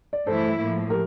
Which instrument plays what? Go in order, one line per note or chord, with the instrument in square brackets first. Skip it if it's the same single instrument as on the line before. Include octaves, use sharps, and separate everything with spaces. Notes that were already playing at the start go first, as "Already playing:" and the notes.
[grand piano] D5
[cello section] G2 E3 A3 E4 [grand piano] A4 C5
[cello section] A2 F3 A#3
[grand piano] G4 A#4